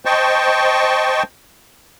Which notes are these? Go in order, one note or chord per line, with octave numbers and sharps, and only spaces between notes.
C5 D#5 G5 A5 C#6